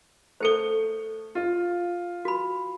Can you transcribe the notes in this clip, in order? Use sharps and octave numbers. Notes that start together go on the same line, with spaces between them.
A3 A4 C5 C#7 G7
F4
F#4 B5